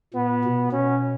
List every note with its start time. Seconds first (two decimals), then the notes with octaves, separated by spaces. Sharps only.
0.14 A#2 B3
0.44 B2
0.72 B2 C#4